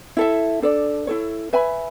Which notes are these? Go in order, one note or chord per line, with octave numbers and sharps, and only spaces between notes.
E4 A4 E5
D4 A4 D5
E4 A4 C#5
B4 E5 G#5 B5